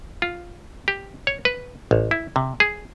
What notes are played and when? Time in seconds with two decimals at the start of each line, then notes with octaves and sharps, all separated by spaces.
0.22 F4
0.88 G4
1.27 C#5
1.45 B4
1.91 A1
2.11 E4
2.36 C3
2.60 G#4